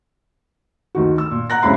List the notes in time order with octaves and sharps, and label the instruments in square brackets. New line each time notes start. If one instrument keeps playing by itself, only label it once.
[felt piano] D2 D#3 F#4
E6
A#2
F#5 A#5 F#6 A#6
C#2 C3 C#4 E4 B5 C7